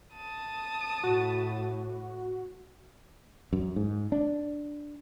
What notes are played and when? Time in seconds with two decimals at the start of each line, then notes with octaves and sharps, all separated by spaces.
0.15 A5 D#6
1.04 A2 F#4
3.53 F#2
3.76 G#2
4.12 D4